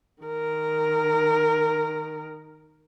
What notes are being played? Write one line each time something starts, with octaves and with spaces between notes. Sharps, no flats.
D#3 A#4